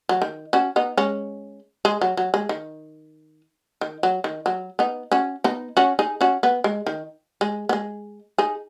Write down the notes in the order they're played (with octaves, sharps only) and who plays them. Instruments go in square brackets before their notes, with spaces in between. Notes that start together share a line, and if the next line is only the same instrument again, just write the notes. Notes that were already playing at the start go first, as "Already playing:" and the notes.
[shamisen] F#3
D#3
C#4 F#4
B3 D#4
G#3 C#4
G#3
F#3
F#3
G#3
D#3
D#3
F#3
D#3
F#3
B3 D#4
C#4 F#4
B3 D#4
C#4 F#4
D#4 G#4
C#4 F#4
B3
G#3
D#3
G#3
B3
G#3
D#4 G#4